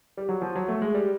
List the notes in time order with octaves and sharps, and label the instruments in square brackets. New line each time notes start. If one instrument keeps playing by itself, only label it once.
[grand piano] G3
F#3
F3
F#3
A3
G#3
G3